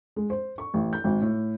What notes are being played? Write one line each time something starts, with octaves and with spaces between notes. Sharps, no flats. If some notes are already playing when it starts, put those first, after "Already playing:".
G#3
C5
C#6
A1
G6
G#1
A2